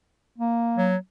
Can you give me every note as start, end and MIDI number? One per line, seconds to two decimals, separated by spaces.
0.38 0.94 58
0.77 0.96 54